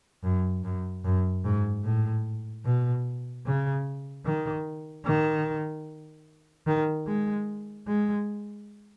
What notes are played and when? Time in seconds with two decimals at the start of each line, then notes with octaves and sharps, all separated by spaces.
0.24 F#2
0.64 F#2
1.04 F#2
1.44 G#2
1.84 A2
2.65 B2
3.45 C#3
4.25 D#3
5.06 D#3
6.67 D#3
7.07 G#3
7.87 G#3